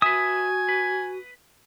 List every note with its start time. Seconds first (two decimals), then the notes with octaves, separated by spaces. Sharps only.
0.02 F#4 B4 E5 G#5 D#6
0.69 B4